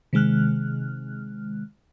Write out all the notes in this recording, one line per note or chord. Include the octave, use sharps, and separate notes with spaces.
C3 D#3 G#3 F6 F#6